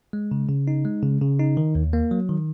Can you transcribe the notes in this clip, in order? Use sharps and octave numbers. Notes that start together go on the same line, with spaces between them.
G#3
C#3
C#3
D#4
G#3
C#3
C#3
D#4
D#3
D#2
A#3
F#3
D#3